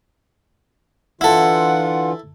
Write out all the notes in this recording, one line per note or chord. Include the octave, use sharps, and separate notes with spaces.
D3 E3 E4 F4 A4 F#5